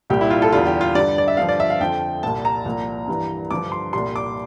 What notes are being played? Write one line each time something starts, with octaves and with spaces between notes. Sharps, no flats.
C2 A#2 G3 G4
E4
F4
A4
E2 D3 G3 F4
G4
F4
G2 D3 G3 D5
D5
E5
G2 D3 F3 F5
D5
E5
F5
F2 D3 F3 G5
C2 A#2 G3 A5
A#5
C2 A#2 F3
G2 E3 G3
G2 D3 F3 D6
C6
C2 A#2 G3 C6
D6